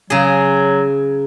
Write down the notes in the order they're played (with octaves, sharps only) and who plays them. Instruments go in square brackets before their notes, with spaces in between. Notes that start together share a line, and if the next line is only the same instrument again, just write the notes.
[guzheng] C#3 G#4 [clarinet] F#3